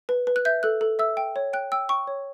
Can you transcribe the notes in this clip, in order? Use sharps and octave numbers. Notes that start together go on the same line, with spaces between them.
B4
B4
F#6
E5 G6
A4 F#6
A4
E5 E6
G5
C#5
G5 F#6
G5 E6
G5 C#6
C#5